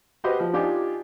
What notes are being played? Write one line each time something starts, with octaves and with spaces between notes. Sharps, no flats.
F#4 G4 B4 C5 D#5
F3
D4 D#4 F4 G4 G#5